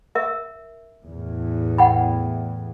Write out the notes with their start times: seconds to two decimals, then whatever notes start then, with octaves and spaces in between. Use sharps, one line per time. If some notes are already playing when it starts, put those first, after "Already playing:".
0.15 A#4 E5
1.07 E2 A2
1.78 F#5 G5 B5